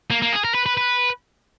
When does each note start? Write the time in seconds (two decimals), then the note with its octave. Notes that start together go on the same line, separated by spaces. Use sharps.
0.11 A#3
0.22 A#3
0.32 G#4
0.44 A#4
0.54 B4
0.66 B4
0.77 B4